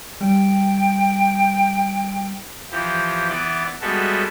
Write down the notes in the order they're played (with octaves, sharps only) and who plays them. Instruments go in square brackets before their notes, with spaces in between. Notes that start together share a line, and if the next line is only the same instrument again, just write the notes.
[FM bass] G3 [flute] G5
[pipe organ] E3 F3 G4
E3 B3 E4 D5
G3 G#3 B3 F#4 A4 E5